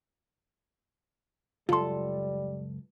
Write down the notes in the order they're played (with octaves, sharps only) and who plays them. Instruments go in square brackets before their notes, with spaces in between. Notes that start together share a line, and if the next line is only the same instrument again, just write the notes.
[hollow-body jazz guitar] C#2 F#2 A4 [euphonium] G3 [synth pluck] F4 C6